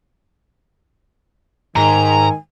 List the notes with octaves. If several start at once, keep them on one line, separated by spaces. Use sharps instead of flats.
G#2 D#3 G#5 A#5